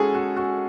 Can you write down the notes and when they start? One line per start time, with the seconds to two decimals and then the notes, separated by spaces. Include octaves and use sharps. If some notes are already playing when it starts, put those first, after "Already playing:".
Already playing: G#3 C#4 F#4 G#4 A4
0.15 F#4
0.37 F#4